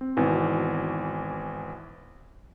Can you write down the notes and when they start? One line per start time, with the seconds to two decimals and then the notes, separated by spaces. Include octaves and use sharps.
0.01 C4
0.17 G#1 B2 E3 G#5